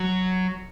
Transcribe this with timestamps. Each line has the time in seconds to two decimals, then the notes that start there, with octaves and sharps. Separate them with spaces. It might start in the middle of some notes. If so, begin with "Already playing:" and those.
Already playing: F#3